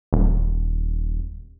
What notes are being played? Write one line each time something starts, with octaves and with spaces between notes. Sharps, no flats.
D#1